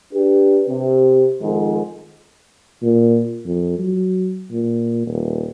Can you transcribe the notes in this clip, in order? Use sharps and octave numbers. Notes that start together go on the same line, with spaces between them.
D4 G4 B4
C3
F2 G#2 D#3
A#2
F2
F#3
A#2
D#1